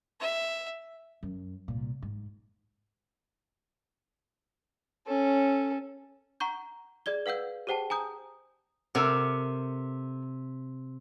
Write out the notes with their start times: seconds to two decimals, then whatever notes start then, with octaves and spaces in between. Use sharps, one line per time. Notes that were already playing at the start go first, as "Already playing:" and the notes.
0.20 E5
1.23 F#2
1.68 C2 A#2
2.02 G#2
5.07 C#4 A4
6.40 F#5 A#5 C#6 G6
7.06 G#4 D5 G#6 G7
7.26 B4 F5 F#5 E6 G6
7.67 G4 G#4 C5 F#5 G5 A5
7.90 G#5 A#5 D#6 G6
8.95 C3 A4 A#4 F#5